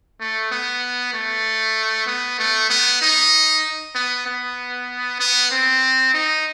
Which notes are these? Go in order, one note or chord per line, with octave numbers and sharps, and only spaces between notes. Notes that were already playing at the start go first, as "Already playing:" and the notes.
A3
B3
A3
B3
A3
B3
D#4
B3
B3
B3
C4
D#4